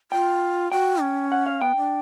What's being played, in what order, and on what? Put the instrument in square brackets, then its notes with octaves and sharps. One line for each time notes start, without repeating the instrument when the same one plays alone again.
[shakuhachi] F4 [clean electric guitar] G5
[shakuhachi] F#4 [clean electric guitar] G5
[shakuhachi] C#4
[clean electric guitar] F#5
F5
[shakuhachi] B3 [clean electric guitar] G5
[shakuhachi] D4